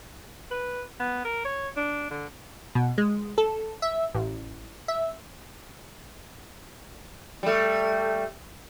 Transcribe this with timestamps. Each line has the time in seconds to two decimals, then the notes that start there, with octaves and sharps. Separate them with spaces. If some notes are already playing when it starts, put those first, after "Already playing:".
0.51 B4
1.00 B3
1.25 A#4
1.45 C#5
1.77 D4
2.10 D3
2.75 B2
2.98 G#3
3.38 A4
3.82 E5
4.15 A1
4.88 E5
7.43 G3 A3